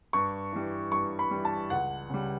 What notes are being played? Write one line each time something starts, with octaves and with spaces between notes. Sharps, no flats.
G2 C#6
E3 G3
G2 C#6
B5
E3 G3
A5
C#2 F#5
C#3 G3